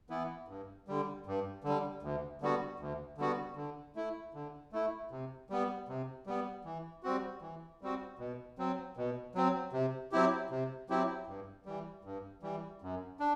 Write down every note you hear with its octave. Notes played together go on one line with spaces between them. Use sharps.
E3 B3 E4
G2
D3 G3
G2
D3 G3
D2
D3 G3 B3 F#4
D2
D3 G3 B3 F#4
D3
A3 E4
D3
A3 E4
C3
G3 B3
C3
G3 B3
E3
G3 C4 F#4
E3
G3 C4 F#4
B2
F#3 C4
B2
F#3 C4
C3
F#3 C4 E4 G4
C3
F#3 C4 E4 G4
G2
E3 G3
G2
E3 G3
F#2
D4